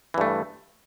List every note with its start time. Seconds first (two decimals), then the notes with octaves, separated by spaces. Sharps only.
0.14 E3
0.18 G2
0.21 A3